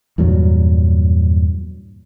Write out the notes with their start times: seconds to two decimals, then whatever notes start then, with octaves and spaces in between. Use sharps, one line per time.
0.18 E2 G2 A#2 F#3